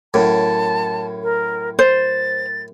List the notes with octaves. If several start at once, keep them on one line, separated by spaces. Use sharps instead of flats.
F#2 A2 A5
A#4
C5 A6